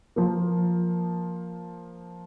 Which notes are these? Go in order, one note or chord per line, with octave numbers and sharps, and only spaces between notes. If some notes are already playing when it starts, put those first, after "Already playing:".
F3 A#3